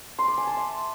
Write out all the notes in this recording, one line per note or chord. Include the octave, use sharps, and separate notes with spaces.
C6
D6
G#5
A5
E5